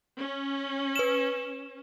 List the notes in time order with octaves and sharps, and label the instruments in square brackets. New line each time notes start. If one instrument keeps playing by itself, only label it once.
[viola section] C#4
[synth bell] B4 E7